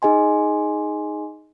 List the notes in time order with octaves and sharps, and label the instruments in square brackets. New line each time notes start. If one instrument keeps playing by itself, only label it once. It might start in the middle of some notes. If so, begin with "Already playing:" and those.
[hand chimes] D#4 G#4 D#5 G#5 C6